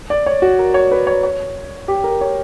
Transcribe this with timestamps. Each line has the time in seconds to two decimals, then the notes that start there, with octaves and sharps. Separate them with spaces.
0.10 D5
0.26 C#5
0.42 F#4
0.59 A#4
0.74 C#5
0.91 B4
1.07 C#5
1.23 C#5
1.88 G4
2.04 A#4
2.21 C#5